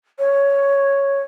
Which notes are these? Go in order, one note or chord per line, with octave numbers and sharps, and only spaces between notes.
C#5